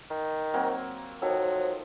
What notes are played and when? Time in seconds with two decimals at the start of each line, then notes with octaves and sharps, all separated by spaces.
0.10 D#3
0.53 F#3 A#3 C4
1.22 D#3 F3 F#3 A4